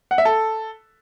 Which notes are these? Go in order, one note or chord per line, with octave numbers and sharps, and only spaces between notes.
F#5
E5
A4